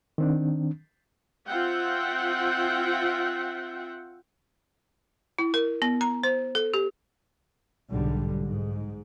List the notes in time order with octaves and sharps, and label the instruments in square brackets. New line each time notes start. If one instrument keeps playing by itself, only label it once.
[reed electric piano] D#3 C4 D4
[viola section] C4 F4 E5 F#5 G5
[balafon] E4
A#4
B3
A#5
C5
A4
G4
[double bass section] B1 G#2 D3 G3
G#2